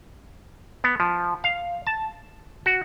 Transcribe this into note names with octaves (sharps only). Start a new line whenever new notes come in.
B3
F3
F5
A5
F#4